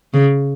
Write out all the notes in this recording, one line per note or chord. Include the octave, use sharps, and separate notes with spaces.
C#3